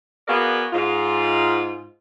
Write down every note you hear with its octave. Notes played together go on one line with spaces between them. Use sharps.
B3 F#4 G#4 A#4 D5 F5
G#2 F4